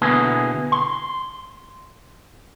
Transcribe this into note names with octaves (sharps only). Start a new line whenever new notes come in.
B2 D3 A#3 B3 E4 G#4
C6